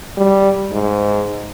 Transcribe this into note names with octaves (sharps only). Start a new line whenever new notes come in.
G3
G#2